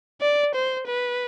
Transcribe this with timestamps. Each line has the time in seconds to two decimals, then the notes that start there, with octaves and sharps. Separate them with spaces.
0.21 D5
0.55 C5
0.87 B4